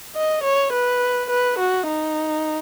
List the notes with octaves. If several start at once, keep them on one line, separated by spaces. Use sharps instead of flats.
D#5
C#5
B4
B4
F#4
D#4